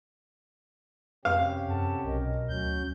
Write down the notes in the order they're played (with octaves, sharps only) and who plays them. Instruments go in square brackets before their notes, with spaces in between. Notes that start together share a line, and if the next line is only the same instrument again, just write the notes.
[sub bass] F2 [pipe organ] C3 C#4 G4 [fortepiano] F5
[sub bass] F#2 [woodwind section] A4 F#5 A5
[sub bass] B1 [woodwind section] B2 A#4 D#5
[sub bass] D2 [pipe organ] F#3 C#4 G6